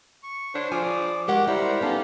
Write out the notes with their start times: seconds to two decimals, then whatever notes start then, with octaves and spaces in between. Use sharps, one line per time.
0.23 C#6
0.55 D4 C5 C#5
0.72 F3 D5 G#5
1.28 G#3 F#4 G4 A#4 F#5
1.48 G3 E4 A#4 C5 F#5
1.81 B3 C#4 D#4 G4 A4 F5